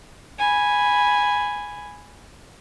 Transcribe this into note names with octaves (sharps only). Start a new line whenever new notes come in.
G#5 B5